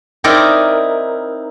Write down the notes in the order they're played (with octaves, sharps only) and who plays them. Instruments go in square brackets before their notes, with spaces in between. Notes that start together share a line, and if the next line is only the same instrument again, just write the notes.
[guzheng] C4 D#4 E4 A#4 D5 D#5